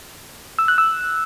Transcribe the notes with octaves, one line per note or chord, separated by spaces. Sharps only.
E6
F#6
E6